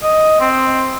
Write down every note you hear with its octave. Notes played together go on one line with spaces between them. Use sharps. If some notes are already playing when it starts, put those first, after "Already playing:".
D#5
C4